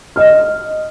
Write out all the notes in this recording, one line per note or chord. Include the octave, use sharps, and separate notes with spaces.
D#5 F6